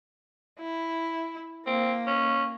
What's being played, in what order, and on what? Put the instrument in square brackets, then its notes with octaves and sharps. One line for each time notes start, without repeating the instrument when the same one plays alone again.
[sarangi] E4
[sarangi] A#3 [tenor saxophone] C4
[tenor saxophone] C#4